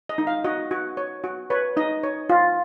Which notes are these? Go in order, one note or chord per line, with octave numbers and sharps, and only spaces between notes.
D#5
D#4
F5
F#4 D#5
F#4
C#5
F#4
B4 C#5
D#4 D#5
C#5
F4